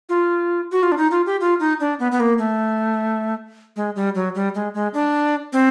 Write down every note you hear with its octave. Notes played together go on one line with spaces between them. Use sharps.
F4
F#4
F4
D4
D#4
F4
G4
F4
D#4
D4
B3
B3
A#3
A3
G#3
G3
F#3
G3
G#3
G#3
D4
C4